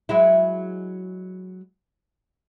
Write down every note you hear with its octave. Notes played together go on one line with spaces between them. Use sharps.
F#3 G#3 E4